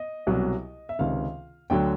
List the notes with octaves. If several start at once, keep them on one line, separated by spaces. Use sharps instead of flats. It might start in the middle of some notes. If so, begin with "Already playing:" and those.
Already playing: D#5
C2 B2 F#3
E5
C#2 C3 D#3 F5
D2 D3 F#3 G5